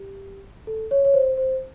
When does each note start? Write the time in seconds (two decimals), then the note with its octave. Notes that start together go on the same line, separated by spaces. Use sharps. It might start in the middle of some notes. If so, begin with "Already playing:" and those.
Already playing: G4
0.67 A4
0.91 C#5
1.05 C#5
1.14 C5
1.37 C5